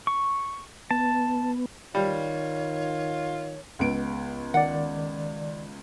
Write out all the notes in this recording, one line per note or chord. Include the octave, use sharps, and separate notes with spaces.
C#6
B3 A5
D#3 G3 F4 C#5
C#2 B3 D7
D#3 D5 F#5